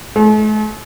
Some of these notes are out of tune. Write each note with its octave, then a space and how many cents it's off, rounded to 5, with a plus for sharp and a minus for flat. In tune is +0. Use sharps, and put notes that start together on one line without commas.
A3 -45